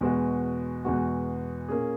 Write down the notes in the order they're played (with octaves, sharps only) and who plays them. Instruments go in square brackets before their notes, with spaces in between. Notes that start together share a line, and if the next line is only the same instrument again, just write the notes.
[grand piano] E2 B2 G#3 B3 F#4
E2 B2 G#3 B3 F#4
A#2 A#3 C#4 G#4